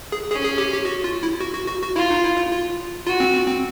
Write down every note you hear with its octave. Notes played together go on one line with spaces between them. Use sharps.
G#4
C#4 G#4
G#4
G4
G4
F#4
F4
E4
F#4
F#4
F#4
F#4
E4 F4
D#4
E4
F4
F4
F4 F#4
C4
C4
C4